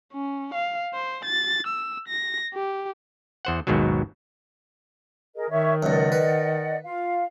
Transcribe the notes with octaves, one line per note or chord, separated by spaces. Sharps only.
C#4
F5
C5
A6
E6
A#6
G4
E2 C5 F#5
G#1 D#2 G#2 B2 D#3 F#3
G#4 A#4 D#5
D#3 C#5 E5 C#6
C#2 F#2 D5 D#5 F#5
B4
F4 F5